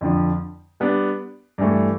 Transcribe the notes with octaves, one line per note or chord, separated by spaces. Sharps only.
F2 D3 F3
G3 B3 D4
G2 E3 A3